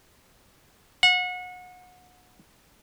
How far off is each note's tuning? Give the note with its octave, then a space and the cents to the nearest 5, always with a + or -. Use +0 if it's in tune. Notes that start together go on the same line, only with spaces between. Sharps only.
F#5 -30